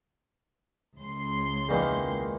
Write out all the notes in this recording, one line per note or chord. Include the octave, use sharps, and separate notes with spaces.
C#2 C6
E2 A#2 D#3